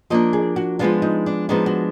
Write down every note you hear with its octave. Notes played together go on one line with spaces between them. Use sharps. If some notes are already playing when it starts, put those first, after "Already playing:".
F3 A#3 D4 D#5
G#4
F#4
F3 G#3 B3 D4 F4
D#4
D4
F3 G#3 B3 D4 D#4
F#4